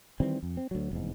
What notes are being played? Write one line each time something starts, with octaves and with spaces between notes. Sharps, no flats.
D#3 E3 G3 C4
F2
C4
D2 F#3
F1 E2 G#2